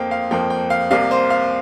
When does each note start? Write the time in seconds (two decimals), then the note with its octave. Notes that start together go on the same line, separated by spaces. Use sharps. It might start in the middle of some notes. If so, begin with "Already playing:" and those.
Already playing: F2 F3 A#3 F5 G5
0.11 F5
0.31 F2 F3 A#3 G5
0.50 G5
0.70 F5
0.90 C2 C3 A#3 F5
1.11 C5
1.30 F5